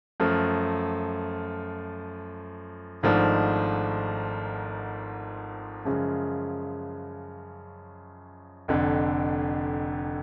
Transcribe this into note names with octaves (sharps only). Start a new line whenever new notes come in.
F#2 F3 A3
G#1 G#2 F3 A3 D4
F#2 C#3 F3 G#3
F1 F2 D3